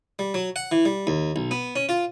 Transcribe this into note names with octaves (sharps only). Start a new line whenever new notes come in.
G3
F#3
F#5
E3
G3
D#2
B1
B3
C#4
F4